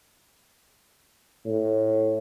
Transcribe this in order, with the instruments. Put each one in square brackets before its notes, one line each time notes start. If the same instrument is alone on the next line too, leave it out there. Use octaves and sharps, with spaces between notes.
[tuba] A2